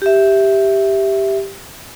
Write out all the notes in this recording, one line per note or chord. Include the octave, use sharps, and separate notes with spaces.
G4 E5